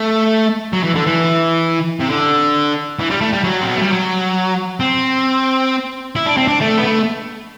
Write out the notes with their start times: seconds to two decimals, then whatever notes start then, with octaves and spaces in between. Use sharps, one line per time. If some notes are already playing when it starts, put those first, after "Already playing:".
Already playing: A3
0.73 F#3
0.83 E3
0.95 D3
1.06 E3
2.00 C3
2.09 D3
2.99 E3
3.10 G3
3.21 A3
3.33 G3
3.44 F#3
3.61 C4
3.69 B3
3.76 A3
3.82 G3
3.89 F#3
4.80 C4
6.16 E4
6.26 D4
6.37 C4
6.48 D4
6.61 A3
6.78 B3
6.84 A3